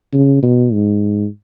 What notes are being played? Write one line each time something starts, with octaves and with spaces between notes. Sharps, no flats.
C#3
B2
G#2